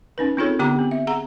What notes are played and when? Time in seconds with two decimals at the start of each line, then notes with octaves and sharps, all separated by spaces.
0.18 C#4 D#4 B4
0.37 C4 D#4 F4 G#4 A4 C#5
0.59 D3 B3 D4 G4 A#5 D6
0.79 C4
0.91 E5
1.07 G#4 F#5 A#5